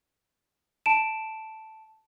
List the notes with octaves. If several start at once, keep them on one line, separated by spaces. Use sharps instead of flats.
A5 D7 E7